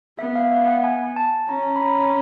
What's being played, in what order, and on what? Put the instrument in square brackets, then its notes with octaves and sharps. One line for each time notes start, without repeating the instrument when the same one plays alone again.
[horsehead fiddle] B3 [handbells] E5
[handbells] F5
E5
F#5
G#5
A5
[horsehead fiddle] C#4 [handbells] A#5
[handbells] B5
A#5